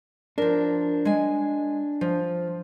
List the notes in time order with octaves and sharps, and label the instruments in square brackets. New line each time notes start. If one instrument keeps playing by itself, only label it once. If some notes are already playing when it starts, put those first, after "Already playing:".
[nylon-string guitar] F3 A#4 [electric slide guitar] D4
[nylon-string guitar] G#3 G#5
F3